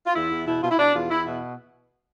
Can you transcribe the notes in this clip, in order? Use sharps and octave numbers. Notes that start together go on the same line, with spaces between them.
F4
E2 E4
E2
B2 E4
B2 F4
E4
B2 D4
E2 F4
E2 E4
B2 E4